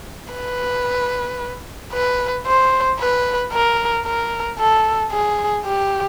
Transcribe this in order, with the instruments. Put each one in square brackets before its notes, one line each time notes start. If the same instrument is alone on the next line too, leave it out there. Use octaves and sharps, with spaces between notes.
[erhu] B4
B4
C5
B4
A#4
A#4
A4
G#4
G4